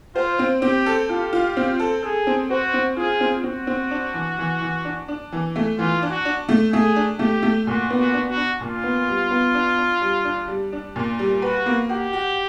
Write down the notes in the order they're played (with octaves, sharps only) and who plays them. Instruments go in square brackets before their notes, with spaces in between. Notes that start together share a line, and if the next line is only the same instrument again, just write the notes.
[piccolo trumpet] F4 [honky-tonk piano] C5
[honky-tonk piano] C4
[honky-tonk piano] C4 [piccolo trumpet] G4
[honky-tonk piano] A4
[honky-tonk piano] F4 [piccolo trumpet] G4
[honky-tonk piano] F4
C4
A4
[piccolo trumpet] G#4 [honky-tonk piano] A4
[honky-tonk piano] C4
[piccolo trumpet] F#4 [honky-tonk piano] C5
[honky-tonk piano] C4
[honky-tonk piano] F4 [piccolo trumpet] G#4
[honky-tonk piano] C4
[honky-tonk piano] C4 [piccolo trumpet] F#4
[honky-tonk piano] C4
D4
E3
E3
E3
D4
D4
E3
A3
[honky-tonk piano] E3 [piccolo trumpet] F4
[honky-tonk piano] D4
[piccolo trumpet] F#4
[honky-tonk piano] D4
A3
[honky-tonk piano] A3 [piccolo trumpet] G#4
[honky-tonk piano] D4
[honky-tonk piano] A3 [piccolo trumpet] G4
[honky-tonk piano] A3
[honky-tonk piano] A#2 [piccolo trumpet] F#4
[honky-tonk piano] B3
[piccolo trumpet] F#4
[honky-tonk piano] D4
[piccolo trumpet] F#4
[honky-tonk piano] D4
[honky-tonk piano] A#2 [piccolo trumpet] F4
[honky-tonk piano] B3
G3
B3
D4
D4
G3
D4
G3
D4
A#2
G3
[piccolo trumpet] F#4 [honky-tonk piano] B4
[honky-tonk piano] A#3
[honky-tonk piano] F#4 [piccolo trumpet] G4
[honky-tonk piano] F#4